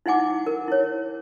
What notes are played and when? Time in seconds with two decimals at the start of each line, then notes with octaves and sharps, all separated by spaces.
0.06 D#4 E4 F#5 G#5 D6
0.46 A#4
0.68 E4 C#5